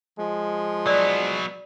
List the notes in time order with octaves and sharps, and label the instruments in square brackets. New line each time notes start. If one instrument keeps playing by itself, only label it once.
[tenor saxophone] F3 [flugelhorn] G#3
[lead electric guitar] F#3 B3 [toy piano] D5